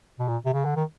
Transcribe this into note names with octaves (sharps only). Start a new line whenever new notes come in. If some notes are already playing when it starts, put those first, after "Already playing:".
B2
A#2
C3
C#3
D3
D#3